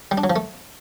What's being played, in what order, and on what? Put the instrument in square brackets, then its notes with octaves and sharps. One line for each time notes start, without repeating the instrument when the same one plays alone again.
[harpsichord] G3
D4
F#3
F3
A3